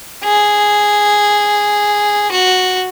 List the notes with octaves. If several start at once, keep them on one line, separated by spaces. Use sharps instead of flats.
G#4
F#4